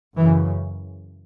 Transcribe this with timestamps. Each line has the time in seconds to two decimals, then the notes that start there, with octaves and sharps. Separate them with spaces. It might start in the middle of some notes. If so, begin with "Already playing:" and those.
0.16 F#2 C#3 E3